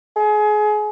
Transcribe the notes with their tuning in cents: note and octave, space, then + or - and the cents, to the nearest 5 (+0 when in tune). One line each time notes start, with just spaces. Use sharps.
G#4 +25